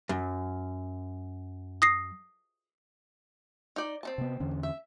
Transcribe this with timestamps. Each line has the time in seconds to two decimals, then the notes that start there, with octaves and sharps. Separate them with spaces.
0.09 F#2
1.82 D#6 A#6 C7
3.76 D#4 D5
4.03 C4 D#4 A5
4.18 C3 B3
4.40 E2 D3 C#4
4.63 E5